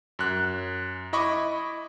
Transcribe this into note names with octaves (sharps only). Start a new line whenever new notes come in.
F#2 F#6
E4 D#5 B5 C#6 D6